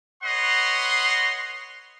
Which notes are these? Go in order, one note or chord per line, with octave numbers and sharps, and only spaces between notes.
B4 C#5 D#5 F#5 C6